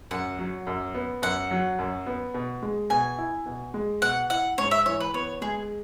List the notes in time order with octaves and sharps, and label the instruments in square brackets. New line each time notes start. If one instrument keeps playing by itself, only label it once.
[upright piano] F#2 [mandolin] F#5
[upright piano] F#3
F#2
B3
[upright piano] F#2 [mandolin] F#5
[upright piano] F#3
F#2
B3
B2
G#3
[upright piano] B2 [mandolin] G#5
[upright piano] E4
B2
G#3
[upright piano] B2 [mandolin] F#5
[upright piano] E4 [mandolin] F#5
[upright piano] G#2 [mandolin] C#5
[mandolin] E5
[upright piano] E3 [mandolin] C#5
[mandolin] B4
[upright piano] B3 [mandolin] C#5
[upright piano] G#3 [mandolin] G#4